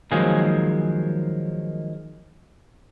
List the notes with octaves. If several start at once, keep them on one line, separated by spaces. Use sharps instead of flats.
D#3 F3 F#3 G#3 A#3 G#4